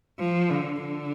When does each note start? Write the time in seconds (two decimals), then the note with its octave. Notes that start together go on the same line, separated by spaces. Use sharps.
0.20 F3
0.51 D3
0.82 D3